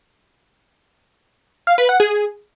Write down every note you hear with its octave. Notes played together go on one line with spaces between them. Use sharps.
F5
B4
F#5
G#4